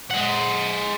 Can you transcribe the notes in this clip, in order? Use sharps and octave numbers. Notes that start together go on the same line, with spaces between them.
G#3 F#5